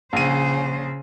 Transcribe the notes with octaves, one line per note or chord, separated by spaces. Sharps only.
A#1 C#3 C5 D#7